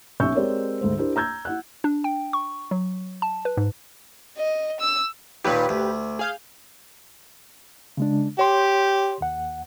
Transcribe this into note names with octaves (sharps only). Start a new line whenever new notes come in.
B1 C#4 E5 C#6 E6 G6
G#3 C4 G4 A#4 C#5 D5
D2 G#2 C5
D4 E4 G4 A#4 C5
A#5 E6 G6 G#6
E4 F#5 F#6
D4
G5
C#6
F#3
A5
B4
G#2
D#5
E6
D#2 A#2 G4 B4
D2
G#4 F5 G6
C#3 G#3 D4
G4 C#5 C6
D#2 F#5